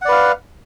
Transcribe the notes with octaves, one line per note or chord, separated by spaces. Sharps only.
B4 D5 F5 F#5